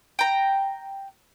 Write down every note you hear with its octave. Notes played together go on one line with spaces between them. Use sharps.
G5 A#5